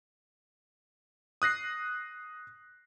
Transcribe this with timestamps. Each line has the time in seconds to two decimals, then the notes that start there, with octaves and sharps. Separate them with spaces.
1.42 D#6 F#6 A#6 C7